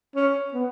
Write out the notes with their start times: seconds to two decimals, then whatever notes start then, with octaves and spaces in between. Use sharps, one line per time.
0.16 C#4
0.54 B3